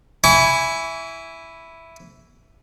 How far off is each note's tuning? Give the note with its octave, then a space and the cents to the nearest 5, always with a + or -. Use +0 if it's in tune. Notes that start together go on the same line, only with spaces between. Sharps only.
E4 +0 G#5 -5 C#6 +45